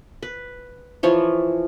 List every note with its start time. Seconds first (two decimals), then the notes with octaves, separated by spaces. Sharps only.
0.23 B4
1.03 E3 F3 C#5